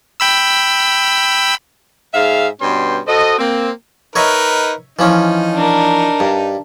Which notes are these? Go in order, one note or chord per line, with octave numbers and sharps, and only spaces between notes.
G5 B5 E6
G#2 G#4 E5 F5
G2 B2 C#4 G5 C6
F#4 A4 C5 D#5
A#3 C4
D#4 A#4 B4 C#5 D#5 E5
E3 F3 C#4 D#4
D4 A#4
G2